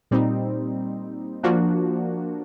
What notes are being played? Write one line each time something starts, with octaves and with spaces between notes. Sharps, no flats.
A#2 G3 C4 D#4
F3 A#3 D4 F#4